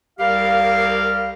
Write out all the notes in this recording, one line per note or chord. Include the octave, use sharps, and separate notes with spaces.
C2 G3 G4 A#4 F5